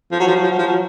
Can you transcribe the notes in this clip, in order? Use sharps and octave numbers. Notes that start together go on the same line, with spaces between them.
F3
F#3
F3
F#3
F3
F#3
F3
F#3